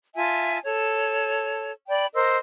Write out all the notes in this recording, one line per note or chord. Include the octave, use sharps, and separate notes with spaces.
F4 E5 G#5 A5
A4 C#5
D5 G5 B5
A#4 C5 D#5 E6